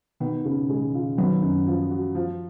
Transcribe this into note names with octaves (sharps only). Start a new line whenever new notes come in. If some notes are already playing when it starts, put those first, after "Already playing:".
B2 D#3 B3
C#3
G#3
F4
D#3 F#3 B3
F#2
F3
F#4
F3